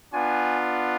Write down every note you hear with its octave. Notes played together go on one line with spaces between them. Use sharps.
B3 D4 F4 G#5